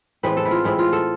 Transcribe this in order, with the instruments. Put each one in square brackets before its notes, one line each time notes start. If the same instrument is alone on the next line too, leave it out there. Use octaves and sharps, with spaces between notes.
[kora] A2 E3 G#3 C4 B4
A4
E4
F4
A2 E3 G#3 C4 E4
F4
A4